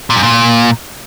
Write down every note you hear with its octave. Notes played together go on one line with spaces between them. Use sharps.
A#2
F#2
A#2